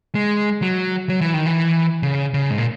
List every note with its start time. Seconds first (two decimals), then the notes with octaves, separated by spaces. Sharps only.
0.15 G#3
0.62 F#3
1.09 F#3
1.21 E3
1.34 D#3
1.46 E3
2.03 C#3
2.34 C#3
2.50 G#2
2.58 A#2